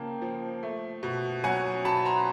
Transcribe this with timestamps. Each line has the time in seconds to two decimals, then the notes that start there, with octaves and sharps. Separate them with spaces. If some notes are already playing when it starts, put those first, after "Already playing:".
Already playing: C#3 F3 A#3 G5 A5
0.22 F3
0.63 A3
1.03 B2
1.44 F#3 F#5 G#5
1.85 B2 A5 B5
2.05 A#5 C6